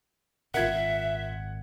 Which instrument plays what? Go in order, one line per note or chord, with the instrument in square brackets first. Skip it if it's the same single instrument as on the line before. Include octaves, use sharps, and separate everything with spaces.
[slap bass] G#1 A#2 [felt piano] F4 A#4 [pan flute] E5 [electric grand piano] F#5 G#6